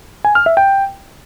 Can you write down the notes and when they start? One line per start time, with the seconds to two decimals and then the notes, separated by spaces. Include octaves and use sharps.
0.25 G#5
0.35 F6
0.46 E5
0.57 G5